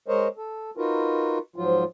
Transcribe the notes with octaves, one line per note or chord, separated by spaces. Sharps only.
G#3 A#4 C5 C#5 D#5
A4
D#4 F4 F#4 A#4 B4
G#2 F3 F#3 F4